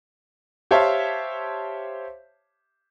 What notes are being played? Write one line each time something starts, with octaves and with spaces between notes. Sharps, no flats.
G4 C5 C#5 E5 F5 A5